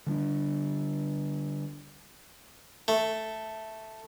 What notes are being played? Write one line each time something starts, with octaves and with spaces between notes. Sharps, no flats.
D3 G3 C#4 D4
A3